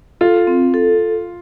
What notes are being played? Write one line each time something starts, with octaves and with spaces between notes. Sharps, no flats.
F4 A4
C4
A4